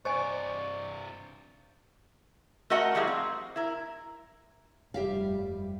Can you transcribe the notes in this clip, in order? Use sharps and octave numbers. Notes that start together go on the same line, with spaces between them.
G2 C3 C5 D5 D#5 G#5 C#6
A3 F#4 A#4 D#5 F#5
F3 G3 E4 F#4 G#4 F5
C4
E4 A#4
F1 G2 G3 G4 E5 F5